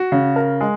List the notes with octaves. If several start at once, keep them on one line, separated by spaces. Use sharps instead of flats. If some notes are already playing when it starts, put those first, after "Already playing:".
Already playing: F#4
C#3
A#4
G#3